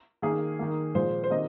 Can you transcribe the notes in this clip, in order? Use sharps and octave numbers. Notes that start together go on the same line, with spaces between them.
D#3 A#3 G#4
D#3 A#3
A#2 F3 G#3 C5
C5
C3 D#3 A#3 D#5